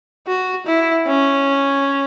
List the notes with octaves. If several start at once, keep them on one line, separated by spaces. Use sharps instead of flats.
F#4
E4
C#4